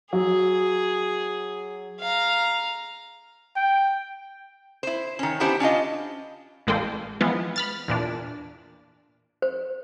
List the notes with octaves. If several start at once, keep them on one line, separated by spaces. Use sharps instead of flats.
F#3 G#4
F5 A#5
G5
E4 C5
D#3 C#4
B3 C#4 D4 E4 G4 C5
C#4 D4 F4 D#5
A1 G#3 A#3 A4 G5 C6
E3 F3 G#3 B3 F4
B5 F6 A6
E2 A#2 D4
C5